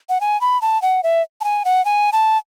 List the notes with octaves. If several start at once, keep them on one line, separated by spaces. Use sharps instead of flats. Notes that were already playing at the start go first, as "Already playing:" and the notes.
F#5
G#5
B5
A5
F#5
E5
A5
G#5
F#5
G#5
A5